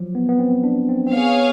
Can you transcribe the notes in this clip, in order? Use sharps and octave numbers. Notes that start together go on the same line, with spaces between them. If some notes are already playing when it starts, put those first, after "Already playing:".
Already playing: F3 F#3
B3
B3
C4
D4
C4
C4
B3 G#4 C#5 F5